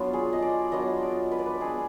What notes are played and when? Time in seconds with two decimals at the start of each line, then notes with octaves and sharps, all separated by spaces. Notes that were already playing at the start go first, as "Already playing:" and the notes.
Already playing: F#3 B3 D4 F4
0.13 G#4
0.33 D#5
0.42 D5
0.72 F#3 B3 D4 F4 D#5
1.02 D5
1.31 B4
1.39 D5
1.46 B4
1.61 G#3 B3 D4 G#4